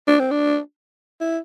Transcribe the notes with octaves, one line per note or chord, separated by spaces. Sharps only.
D4
C4
D4
E4